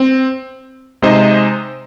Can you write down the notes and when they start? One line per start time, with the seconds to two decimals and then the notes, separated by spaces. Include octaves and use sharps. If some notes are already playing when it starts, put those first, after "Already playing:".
Already playing: C4
1.02 C3 G#3 D#4 C5 D#5